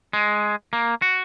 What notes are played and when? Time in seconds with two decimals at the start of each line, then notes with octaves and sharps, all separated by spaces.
0.13 G#3
0.73 A#3
1.02 F#4